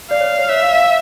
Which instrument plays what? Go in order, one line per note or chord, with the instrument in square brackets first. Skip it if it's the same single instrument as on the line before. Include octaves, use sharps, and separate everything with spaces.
[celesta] D5 [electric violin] F5
[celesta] C#5
C#5
[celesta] C#5 [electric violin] E5
[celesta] F5
F5